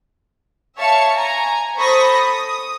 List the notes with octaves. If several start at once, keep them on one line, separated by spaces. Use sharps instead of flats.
C#5 E5 F5 A5 C#6 C#7
G#5 A#5
A4 C5 B5 C#6 D#6 A#6
D#6